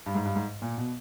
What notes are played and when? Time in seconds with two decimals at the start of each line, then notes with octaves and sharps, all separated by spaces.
0.06 G2
0.15 G#2
0.25 G2
0.36 G#2
0.62 A#2
0.78 B2